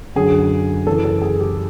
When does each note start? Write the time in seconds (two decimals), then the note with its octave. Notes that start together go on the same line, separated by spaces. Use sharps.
0.15 F#2 D3 F#3 G#4
0.87 F#2 C#3 E3 A4
1.05 A4
1.22 G#4
1.40 G4